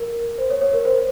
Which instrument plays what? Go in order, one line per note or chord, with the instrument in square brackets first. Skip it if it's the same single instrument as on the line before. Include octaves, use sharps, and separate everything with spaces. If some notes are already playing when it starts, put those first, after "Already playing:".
Already playing: [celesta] A#4
C5
C#5
C#5
A#4
C5